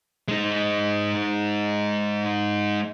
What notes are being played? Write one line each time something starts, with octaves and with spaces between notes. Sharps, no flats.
G#3 D#4